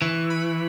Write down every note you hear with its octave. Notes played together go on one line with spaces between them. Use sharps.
E3 C#6
B5